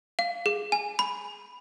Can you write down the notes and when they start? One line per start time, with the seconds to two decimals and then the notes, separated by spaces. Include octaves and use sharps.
0.19 F5
0.46 G#4
0.72 G#5
0.99 B5